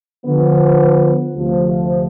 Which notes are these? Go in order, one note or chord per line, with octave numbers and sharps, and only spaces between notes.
D3 F3 B3
D2 C3 F3